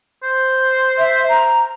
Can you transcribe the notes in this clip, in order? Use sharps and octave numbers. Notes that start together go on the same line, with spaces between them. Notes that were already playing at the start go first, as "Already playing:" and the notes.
C5
E5
A#5